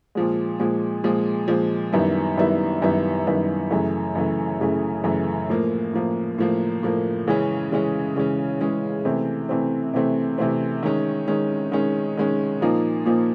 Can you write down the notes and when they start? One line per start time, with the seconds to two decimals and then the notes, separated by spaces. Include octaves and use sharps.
0.15 A#2 F3 G#3
0.59 A#2 F3 G#3
1.04 A#2 F3 G#3
1.48 A#2 F3 G#3
1.93 F#2 D#3 G3 B3 E4
2.37 F#2 D#3 G3 B3 E4
2.82 F#2 D#3 G3 B3 E4
3.27 F#2 D#3 G3 B3 E4
3.70 F#2 C#3 E3 A3
4.15 F#2 C#3 E3 A3
4.60 F#2 C#3 E3 A3
5.04 F#2 C#3 E3 A3
5.50 A2 F3 A#3
5.93 A2 F3 A#3
6.38 A2 F3 A#3
6.83 A2 F3 A#3
7.27 C#3 E3 G#3 C#4
7.72 C#3 E3 G#3 C#4
8.16 C#3 E3 G#3 C#4
8.61 C#3 E3 G#3 C#4
9.05 C3 E3 A3 C4
9.49 C3 E3 A3 C4
9.94 C3 E3 A3 C4
10.38 C3 E3 A3 C4
10.83 D#3 G#3 C#4
11.28 D#3 G#3 C#4
11.72 D#3 G#3 C#4
12.17 D#3 G#3 C#4
12.61 A#2 F3 A#3 D#4
13.05 A#2 F3 A#3 D#4